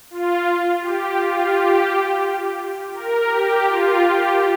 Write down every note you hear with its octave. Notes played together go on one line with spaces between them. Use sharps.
F4
G4
F4
G4
A#4
G4
F4
G4